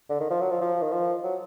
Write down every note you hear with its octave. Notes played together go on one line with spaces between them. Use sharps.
D3
D#3
F3
F#3
F3
F3
D#3
F3
F#3